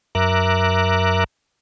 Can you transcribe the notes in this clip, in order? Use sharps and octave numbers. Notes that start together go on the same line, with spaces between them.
F#2 A#4 E5 A#5 D6 F#6